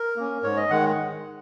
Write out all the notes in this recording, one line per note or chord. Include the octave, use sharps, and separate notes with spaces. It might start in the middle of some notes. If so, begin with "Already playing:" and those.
Already playing: A#4
A#3 C#4
G#2 C#5
D#5
D#3 G#3 F#5